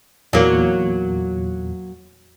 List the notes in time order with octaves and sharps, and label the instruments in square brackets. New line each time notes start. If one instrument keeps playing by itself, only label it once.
[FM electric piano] E2 A#2 [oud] F#3 A#3